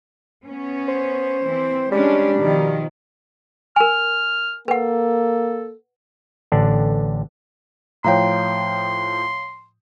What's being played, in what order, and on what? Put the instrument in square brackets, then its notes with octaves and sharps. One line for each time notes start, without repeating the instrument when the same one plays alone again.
[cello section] B3 C#4
[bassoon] C5
[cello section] E3 C4
[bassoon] G3 [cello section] G#3 C#4 D4
[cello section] B2 D#3 F3
[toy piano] A#4 G#5 [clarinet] F6
[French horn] A#3 [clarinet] A4 [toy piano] B4 F#5
[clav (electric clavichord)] A1 D3 D4
[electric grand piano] A2 F3 G5 [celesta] C#5 F5 A#5 [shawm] C6